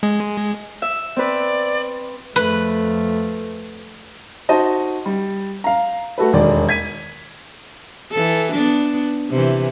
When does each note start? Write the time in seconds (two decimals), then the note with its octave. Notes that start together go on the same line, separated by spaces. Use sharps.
0.03 G#3
0.82 E5
1.16 C4 B4 D5
2.36 F2 A3 B4
4.49 D#4 F#4 C5 D#5 A5
5.06 G3
5.64 F5 A#5
6.18 A3 F#4 A4 B4
6.33 E1 D#2 D#3 D5
6.69 G#6 B6 D#7
8.12 E3 A4
8.52 B3 D4
9.30 C3 E3